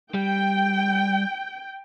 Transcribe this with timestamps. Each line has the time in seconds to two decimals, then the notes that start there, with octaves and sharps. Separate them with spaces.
0.14 G3 G5